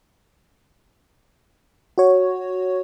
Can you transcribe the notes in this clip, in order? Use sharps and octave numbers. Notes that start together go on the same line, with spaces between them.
F#4 C#5